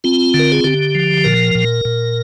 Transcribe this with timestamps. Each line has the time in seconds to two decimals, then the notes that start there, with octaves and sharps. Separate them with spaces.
0.04 C4 F4
0.34 D3
0.39 A#4
0.52 G#4
0.64 D3 G4
0.95 F3
1.24 A#2 A#4
1.55 A#2
1.85 A#2